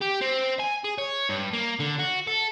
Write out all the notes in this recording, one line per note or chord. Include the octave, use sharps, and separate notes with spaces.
G4
C4
G#5
G#4
C#5
G2
A#3
D3
F#4
A4